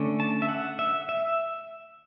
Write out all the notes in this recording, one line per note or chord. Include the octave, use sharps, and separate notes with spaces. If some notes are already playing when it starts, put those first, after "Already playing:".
Already playing: D3 A3 C#4
A5
E5
F#5
E5
E5